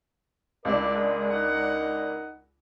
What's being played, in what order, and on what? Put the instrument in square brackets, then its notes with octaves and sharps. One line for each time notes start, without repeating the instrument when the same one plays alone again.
[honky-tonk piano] C#2 D4 [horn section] E4 D5 [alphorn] A#4
[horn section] G#3
D#4 F#5